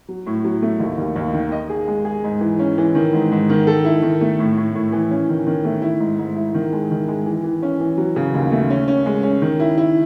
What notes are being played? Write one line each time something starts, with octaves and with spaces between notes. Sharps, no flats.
F#3
A2
F#3
A3
D#2
D#2
D#2
D#3
D#5
G#4
G#3
G#4
G#2
E3
C#4
E3
D#3
G#2
G#2
D#3
A4
E4
D#3
A3
A2
A2
A2
E3
C#4
D#3
D#3
A3
E4
G#2
G#2
E4
D#3
G#3
D#3
G#3
E3
E3
C#4
E3
F#3
C#3
D#2
A3
C#4
C#4
G#3
C#4
D#3
E4
E4